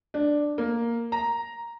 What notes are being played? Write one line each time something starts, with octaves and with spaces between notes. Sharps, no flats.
D4
A#3
A#5